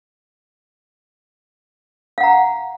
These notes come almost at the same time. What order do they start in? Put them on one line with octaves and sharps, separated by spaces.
F5 F#5 A#5